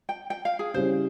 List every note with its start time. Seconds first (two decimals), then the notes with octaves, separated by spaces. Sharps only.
0.09 G5
0.30 G5
0.45 F5
0.59 G#4
0.74 C#3 G3 C#4 E4 C5